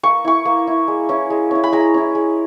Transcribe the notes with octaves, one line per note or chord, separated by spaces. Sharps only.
A#3 C#6
E4 C#6
A#3
E4
G#3
C#4 E4
G#3
C#4 E4
B5
G#3 A#5
C#4 E4
G#3